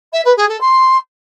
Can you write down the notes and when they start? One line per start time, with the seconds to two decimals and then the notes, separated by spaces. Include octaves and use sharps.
0.13 E5
0.25 B4
0.36 G#4
0.48 A4
0.60 C6